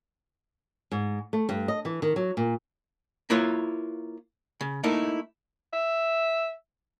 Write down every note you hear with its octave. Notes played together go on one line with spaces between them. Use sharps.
G#2
A3
G2
D#5
E3
D#3
F#3
A#2
A#3 E4 F4 B4 C#5
C#3
A3 A#3 D#4 E4 A#4
E5